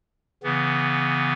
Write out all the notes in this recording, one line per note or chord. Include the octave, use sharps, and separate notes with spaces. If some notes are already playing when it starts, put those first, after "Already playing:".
C#3 E3 B3